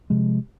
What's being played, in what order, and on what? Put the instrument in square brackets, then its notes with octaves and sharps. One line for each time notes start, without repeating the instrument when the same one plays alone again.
[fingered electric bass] C3 F3 G#3